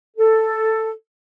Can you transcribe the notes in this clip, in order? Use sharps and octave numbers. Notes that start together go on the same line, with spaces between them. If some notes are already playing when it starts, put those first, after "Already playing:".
A4